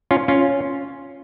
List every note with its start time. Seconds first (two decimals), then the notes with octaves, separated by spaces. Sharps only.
0.11 C#4 F4
0.28 C#4 F4